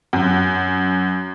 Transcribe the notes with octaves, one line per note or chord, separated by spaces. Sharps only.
F#2